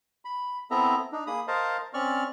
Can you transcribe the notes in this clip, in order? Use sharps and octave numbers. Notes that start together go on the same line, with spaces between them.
B5
B3 C4 E4 A4 E5 A#5
D4 D#4
A#3 G#4 B5 D#6
A#4 C5 D#5 F5 A5
C4 C#4 D5 C#6 F6